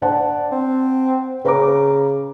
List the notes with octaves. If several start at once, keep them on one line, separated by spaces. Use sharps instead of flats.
D4 C5 F#5 A5
C4
C#3 B4 A#5 D6